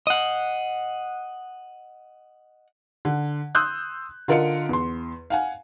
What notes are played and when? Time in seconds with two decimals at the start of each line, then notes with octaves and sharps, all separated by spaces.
0.07 D#5 F#5
3.05 D3
3.55 C6 D#6 E6 F#6 G6
4.28 D3 F4 A#4 D#5 F5 C#7
4.69 E2 C6
5.30 F5 F#5 G#5